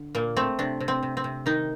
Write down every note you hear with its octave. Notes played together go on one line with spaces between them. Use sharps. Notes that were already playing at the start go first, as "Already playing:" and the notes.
Already playing: D3
A#2 A#3
A3 C4
C3 D4
C3
C4
C3
C4
C3
D#3 D#4